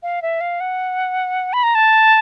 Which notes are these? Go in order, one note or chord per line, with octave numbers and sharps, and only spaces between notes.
F5
E5
F5
F#5
B5
A#5
A5